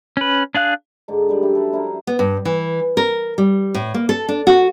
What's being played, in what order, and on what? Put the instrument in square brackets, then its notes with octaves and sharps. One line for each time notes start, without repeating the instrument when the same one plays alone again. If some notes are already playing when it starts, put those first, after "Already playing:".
[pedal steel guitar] C#4 B4
D4 G#4 F5 F#6
[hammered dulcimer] G#2 D3 D6
G3 G4 D5
F#2 E4 G5
A4 B4 C5
D4 E4 A#4 C5
C5
[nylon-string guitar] B3
G2
E3
A#4
G3
A2
A#3
A4
D4
F#4